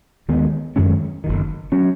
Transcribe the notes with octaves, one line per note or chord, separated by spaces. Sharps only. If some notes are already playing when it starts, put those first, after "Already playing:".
D#2 D#3 G#3 B3
F#2 D#3 G#3 C#4
F#1 F#2 D#3
F#3 C#4